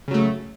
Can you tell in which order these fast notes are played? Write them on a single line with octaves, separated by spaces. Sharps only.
C#3 F#3 A3